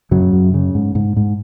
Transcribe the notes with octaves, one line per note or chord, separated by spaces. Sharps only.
F#2 C#3 F#3
F#2
C#3
G#2
G#2
G#2